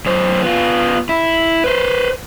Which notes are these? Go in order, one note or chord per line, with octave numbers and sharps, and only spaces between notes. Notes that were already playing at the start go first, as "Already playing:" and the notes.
F#2 C5
B3 F4
E4
B4 C5